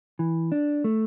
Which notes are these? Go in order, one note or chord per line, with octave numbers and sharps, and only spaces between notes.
E3
D4
A3